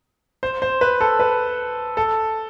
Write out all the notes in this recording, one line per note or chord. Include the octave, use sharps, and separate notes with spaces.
C5
C5
B4
A4
B4
A4